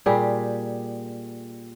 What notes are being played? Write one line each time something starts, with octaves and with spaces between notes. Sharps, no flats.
A#2 G3 G4 G#4